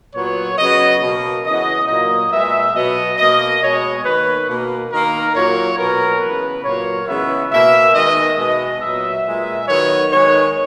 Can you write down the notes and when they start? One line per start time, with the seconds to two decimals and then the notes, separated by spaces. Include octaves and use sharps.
0.15 A#2 F#3 B3 C#5
0.58 C#3 F#3 B3 D#5
1.02 B2 A#3 D#5
1.46 C#3 E3 B3 D#5
1.88 A#2 F#3 A#3 D#5
2.32 A#2 G#3 B3 E5
2.75 B2 F#3 B3 D#5
3.18 B2 A#3 D#5
3.61 B2 G#3 B3 C#5
4.04 D#3 A#3 B4
4.49 B2 A#3
4.91 D#3 A#3 A#4
5.35 A#2 F#3 A#3 C#5
5.78 B2 F#3 B3 A#4
6.21 C#3 E3 B3 B4
6.64 A#2 F#3 A#3 C#5
7.08 C#3 E3 G#3 B3 E5
7.52 B2 A#3 E5
7.94 D#3 G#3 B3 D#5
8.38 B2 G#3 B3 D#5
8.81 A#2 F#3 B3 E5
9.25 A#2 G#3 B3
9.67 D#3 F#3 B3 C#5
10.11 D#3 G#3 B3 C#5